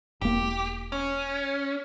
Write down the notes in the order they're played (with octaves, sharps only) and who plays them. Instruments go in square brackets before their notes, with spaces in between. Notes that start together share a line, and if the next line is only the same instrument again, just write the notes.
[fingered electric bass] E1 A#3 [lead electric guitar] G4
[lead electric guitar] C#4